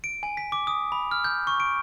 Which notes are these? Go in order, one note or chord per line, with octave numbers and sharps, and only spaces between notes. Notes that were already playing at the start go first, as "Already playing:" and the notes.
D7
G#5
B6
D6
D#6
B5
F6
G6
C#6
D7